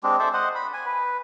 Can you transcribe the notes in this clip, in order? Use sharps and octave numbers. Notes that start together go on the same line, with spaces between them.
G#3 C4 D4 G4
A4 C5 D5 E5
C5 D#5 F#5
B5
G#5
B4